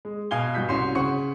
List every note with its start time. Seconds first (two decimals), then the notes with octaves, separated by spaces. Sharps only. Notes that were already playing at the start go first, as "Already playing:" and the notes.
0.05 G#3
0.31 B2 F5 G#5 G#6 G7
0.54 G2 F#4 G6 B6
0.68 C2 C#4 F#4 C6 C7 E7
0.95 C#3 C#4 C5 F#5 C#6 C#7